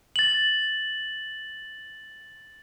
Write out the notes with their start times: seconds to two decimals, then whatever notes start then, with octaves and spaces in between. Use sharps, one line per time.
0.16 A6 F#7